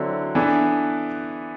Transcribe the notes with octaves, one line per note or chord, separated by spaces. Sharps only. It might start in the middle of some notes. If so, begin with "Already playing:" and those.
Already playing: D3 F#3 C4 E4
E3 B3 D4 A4